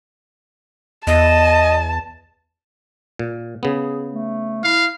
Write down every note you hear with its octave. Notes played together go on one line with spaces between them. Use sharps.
E2 D#5 A5
A#2
C#3 B3 G#4
A3
E4 F5